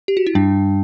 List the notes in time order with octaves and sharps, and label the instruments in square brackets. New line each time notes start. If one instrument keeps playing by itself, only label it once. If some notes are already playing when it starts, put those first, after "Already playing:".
[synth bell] G4
F#4
E4
[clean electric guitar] G2 [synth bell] D4